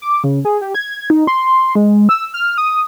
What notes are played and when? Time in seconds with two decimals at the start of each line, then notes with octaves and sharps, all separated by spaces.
0.02 D6
0.24 C#3
0.45 G#4
0.61 G4
0.75 G#6
1.10 D#4
1.27 C6
1.75 G#3
2.09 E6
2.34 F6
2.58 D#6